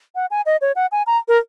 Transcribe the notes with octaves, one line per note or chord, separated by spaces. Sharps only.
F#5
G#5
D#5
C#5
F#5
G#5
A#5
A#4